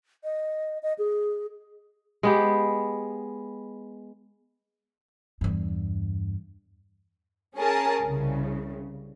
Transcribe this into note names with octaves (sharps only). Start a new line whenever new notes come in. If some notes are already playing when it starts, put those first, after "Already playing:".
D#5
D#5
G#4
G#3 B3 G4
E2 G2
C#4 G#4 A#4 A5
C2 C#3